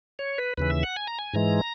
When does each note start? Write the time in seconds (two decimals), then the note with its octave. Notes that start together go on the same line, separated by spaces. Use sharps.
0.19 C#5
0.38 B4
0.57 D#2 C#3 E3 B4
0.70 E5
0.83 F#5
0.96 G#5
1.07 A#5
1.18 G#5
1.34 G#2 E3 G#3 A#5